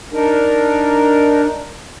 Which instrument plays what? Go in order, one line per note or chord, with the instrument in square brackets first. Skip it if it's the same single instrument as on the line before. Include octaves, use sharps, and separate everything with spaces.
[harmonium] D4 D#4 A#4